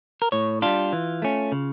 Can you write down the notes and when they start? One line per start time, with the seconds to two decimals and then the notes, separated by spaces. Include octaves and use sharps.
0.22 A#4
0.32 A2 C#5
0.62 G3 D4 F4
0.93 E3
1.22 A3 C#4
1.52 C#3